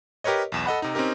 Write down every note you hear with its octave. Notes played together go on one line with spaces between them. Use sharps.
G4 A#4 B4 C#5 D#5
B1 E2 E7
A4 D#5 F#5 B5
C3 D#4
C4 C#4 D#4 G4 A#4